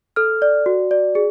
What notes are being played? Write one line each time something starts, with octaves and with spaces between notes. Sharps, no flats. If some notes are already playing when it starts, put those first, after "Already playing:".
A4 F6
D5
F#4
D5
G#4